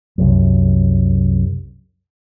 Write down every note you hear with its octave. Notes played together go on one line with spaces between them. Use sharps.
C2 F#2